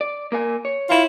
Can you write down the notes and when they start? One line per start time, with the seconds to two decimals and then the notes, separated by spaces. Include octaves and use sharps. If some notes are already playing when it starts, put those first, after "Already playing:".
0.01 D5
0.32 A#3 A#4 G#5
0.65 C#5
0.89 E4 F4